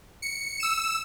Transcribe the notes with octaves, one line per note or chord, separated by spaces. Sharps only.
C#7
E6 E7